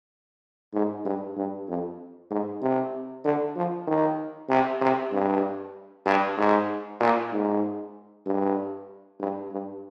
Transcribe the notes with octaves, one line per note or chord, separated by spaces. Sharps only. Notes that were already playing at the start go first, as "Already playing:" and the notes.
G#2
G2
G2
F2
G#2
C3
D3
F3
D#3
C3
C3
G2
G2
G#2
A#2
G#2
G2
G2
G2